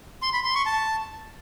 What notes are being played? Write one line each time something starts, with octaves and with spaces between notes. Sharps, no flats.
C6
B5
C6
C#6
A5